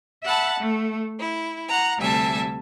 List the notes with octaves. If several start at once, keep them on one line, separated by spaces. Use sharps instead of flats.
E5 F#5 A5 B5
A3
E4
F#5 A#5
D2 C3 G3 E5 G#5 A5